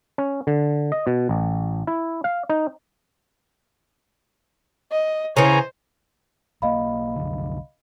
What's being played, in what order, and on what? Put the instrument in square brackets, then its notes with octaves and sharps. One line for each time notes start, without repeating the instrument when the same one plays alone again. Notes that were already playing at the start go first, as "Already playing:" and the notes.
[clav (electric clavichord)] C#4
D3
D#5
B2
A1
E4
F5
D#4
[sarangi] D#5
[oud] C#3 E3 [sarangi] C5 [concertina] C#5 G#5 A#5
[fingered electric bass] B1 A#3 [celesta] D#5 F5 B5
[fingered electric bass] C2 F#2 D3